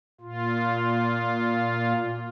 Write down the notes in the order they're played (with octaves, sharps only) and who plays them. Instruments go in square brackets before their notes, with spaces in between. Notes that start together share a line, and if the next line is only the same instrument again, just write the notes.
[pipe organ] A#2 F4